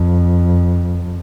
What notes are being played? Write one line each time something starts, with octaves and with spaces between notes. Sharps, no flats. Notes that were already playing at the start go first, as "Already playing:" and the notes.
Already playing: F2